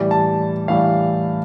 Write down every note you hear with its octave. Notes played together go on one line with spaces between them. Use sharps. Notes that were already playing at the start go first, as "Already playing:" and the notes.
Already playing: A2 E3 G3
A5
A2 E3 G3 F5